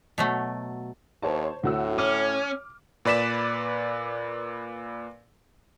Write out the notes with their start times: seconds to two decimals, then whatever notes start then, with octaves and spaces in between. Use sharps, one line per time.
0.18 B2 F#3 A3
1.22 D#2 C5 C#5 A5
1.64 D2 A2 F#4 E6
1.98 C#4 D6 F6
3.05 A#2 B4 D5 B6 E7